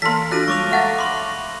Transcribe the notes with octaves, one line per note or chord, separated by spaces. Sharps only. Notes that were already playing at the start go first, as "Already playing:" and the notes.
E3 A#3 A4 A#4 F5 C6 B6
D4 F4 F#4 D5 F#6 A#6 D#7
G3 G#3 C#5 C#6 D6 F7
A3 F5 F#5 A#5 A6
B5 C6 D6